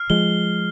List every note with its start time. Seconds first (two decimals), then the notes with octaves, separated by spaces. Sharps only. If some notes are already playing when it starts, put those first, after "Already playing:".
Already playing: F6 C7
0.10 F3 G#3 G7